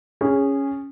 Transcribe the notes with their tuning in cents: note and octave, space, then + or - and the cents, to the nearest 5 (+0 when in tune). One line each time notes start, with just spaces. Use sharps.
C#4 +0 G#4 -15